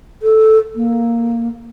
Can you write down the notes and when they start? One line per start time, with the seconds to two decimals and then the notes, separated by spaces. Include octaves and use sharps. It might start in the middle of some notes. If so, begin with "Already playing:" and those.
0.22 A4
0.75 A#3